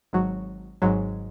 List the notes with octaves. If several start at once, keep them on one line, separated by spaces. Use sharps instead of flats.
G#1 G#2 F#3
G#1 G#2 F#3